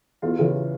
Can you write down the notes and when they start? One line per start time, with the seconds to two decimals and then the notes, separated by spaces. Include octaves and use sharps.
0.22 E2 F4
0.39 C#3 E3